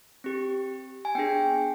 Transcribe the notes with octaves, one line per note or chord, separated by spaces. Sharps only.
C4 G4
G#5
B3 D4 G#4 G5